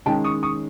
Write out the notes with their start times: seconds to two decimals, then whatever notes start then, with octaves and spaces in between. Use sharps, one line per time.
0.06 D#3 G#3 C#4 G5 A5
0.24 C#6 D#6
0.43 C#6 D#6